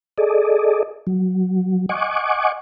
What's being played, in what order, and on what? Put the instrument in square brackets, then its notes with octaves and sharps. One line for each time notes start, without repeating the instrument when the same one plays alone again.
[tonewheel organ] G#4 A4 D5 D#5
F#3
D#5 F#5 G#5 C#6 D6